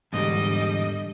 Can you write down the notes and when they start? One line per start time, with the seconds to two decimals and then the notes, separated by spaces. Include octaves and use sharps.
0.13 E2 G#2 D3 G3 D#5